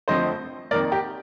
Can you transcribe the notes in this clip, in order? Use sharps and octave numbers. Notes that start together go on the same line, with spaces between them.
F2 D3 F3 A3 C4 C5 D#5
F2 D#3 A#3 A#4 D5
G4 A#4